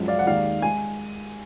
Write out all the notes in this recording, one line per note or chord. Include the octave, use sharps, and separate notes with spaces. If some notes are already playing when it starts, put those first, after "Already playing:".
Already playing: F#2 F3 G#3
D5 F5
F#5
D#2 D#3 G#3 D5 F5
G#3 G#5